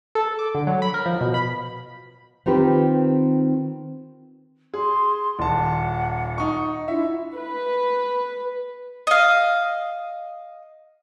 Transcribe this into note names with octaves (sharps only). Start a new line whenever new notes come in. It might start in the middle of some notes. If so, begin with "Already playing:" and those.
A4
D6
D3
F#3
B5
A#4
F3
B2
B5
D#3 C4 F4 G4 B4
G#4 C6
D#1 F#5 A5
D#4 C#6
D4 E4 F4 E5
B4
D#5 F5